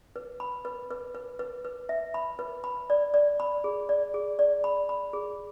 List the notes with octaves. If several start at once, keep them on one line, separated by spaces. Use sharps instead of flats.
B4
B5
B4
B4
B4
B4
B4
E5
B5
B4
B5
D5
D5
B5
G#4
D5
G#4
D5
B5
B5
G#4